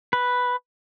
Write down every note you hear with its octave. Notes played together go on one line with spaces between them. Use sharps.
B4